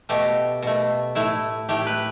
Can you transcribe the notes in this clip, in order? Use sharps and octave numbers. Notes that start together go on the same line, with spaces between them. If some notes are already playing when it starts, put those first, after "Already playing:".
B2 A3 G4
B2 A3
A2 A3 E4
A2 A3 G4
B4